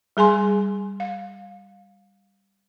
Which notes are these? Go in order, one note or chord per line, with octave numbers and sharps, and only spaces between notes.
G3 G#4 G#5 C6
F5